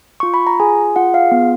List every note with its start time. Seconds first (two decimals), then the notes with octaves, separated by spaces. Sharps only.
0.20 F4 C#6
0.34 B5
0.47 A#5
0.60 G#4 G#5
0.96 F4 F#5
1.14 F5
1.32 B3